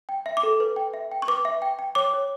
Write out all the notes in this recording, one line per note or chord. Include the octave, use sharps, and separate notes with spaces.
G5
E5
D6
A4
B4
G5
E5
G5
C#6
B4 D6
E5
G5
G5
C#5 D6
C#5